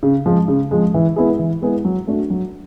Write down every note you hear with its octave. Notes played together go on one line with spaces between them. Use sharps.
C#3
F3 G#3
C#3
F3 G#3
E3
G#3 B3 E4 G#4
E3
G#3 B3 E4 G#4
F#3
A3 D4 F#4
F#3